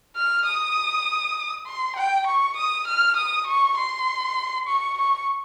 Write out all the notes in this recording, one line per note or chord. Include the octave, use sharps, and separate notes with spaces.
F6
D#6
C6
G5
C#6
D#6
F6
D#6
C#6
C6
C#6
C#6